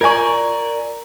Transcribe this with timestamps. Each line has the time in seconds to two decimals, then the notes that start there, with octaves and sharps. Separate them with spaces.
0.01 F4 A#4 C#5 D5 G#5 A#5 C#6 G#6